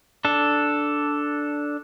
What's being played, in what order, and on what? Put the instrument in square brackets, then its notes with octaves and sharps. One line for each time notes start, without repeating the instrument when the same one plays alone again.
[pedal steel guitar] D4 A4